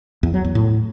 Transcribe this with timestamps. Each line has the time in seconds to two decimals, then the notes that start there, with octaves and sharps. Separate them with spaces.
0.23 E2
0.34 F#3
0.44 E2
0.55 A2